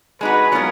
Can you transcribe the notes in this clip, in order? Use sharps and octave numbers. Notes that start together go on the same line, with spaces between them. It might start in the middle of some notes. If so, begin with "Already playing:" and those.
G#3 D#4 F#4 B4
F#3 B3 F4 A#4